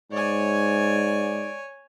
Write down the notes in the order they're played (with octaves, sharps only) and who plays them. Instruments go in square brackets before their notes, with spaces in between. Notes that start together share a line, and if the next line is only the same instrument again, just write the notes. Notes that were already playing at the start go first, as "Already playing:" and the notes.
[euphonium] G#2 [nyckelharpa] C#5 G#5 [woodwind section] D5